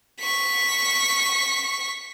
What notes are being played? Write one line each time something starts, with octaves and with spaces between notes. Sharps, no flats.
C#6 B6